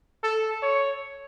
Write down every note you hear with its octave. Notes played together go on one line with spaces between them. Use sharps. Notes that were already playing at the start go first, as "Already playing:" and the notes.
A4
C#5